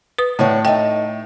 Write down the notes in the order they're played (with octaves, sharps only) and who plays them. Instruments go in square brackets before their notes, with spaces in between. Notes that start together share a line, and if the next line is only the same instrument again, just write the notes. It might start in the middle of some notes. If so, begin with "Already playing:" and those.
[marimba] B4 D#6
[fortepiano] A2 [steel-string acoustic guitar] D4 C#5 F#5
[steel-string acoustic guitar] A3 D#4 [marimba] G5